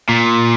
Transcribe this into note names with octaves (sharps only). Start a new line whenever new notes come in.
A#2